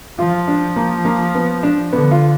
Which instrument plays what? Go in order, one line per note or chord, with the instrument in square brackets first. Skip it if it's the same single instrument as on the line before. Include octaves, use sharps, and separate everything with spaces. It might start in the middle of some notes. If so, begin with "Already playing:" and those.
[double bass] F3 [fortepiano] F4
[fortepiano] D4
A#3
A#3
B3
D4
[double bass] D3 [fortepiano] B3
[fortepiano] F4